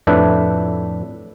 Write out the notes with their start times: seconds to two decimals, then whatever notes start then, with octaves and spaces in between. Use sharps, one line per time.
0.07 F2 A2 D4 B4 E5